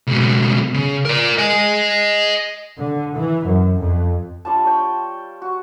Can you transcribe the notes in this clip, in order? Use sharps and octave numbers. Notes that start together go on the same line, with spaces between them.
C#2 B2
C#3
A#4 D5
D#5 G#5
D3
E3
F#2
F2
G3 D4 F4 A5
C#5 G5
F#4